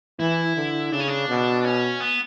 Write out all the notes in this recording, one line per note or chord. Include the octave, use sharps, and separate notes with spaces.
E3 E4
D3
C#3 D4
C#4
D4
B2
C#4
B3